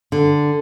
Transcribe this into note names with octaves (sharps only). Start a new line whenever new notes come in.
D3